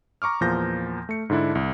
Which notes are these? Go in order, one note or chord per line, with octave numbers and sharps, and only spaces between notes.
A#5 C#6 D6 F6
E2 A#2 F3 A#5 G6 A#6
A3 C#7
G#2 D3 D4 E4
C2